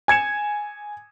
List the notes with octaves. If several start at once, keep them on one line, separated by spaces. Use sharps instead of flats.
G#5 G#6 C#7 E7